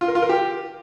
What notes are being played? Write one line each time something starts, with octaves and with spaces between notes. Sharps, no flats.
F4
A#4
F4
A#4
G4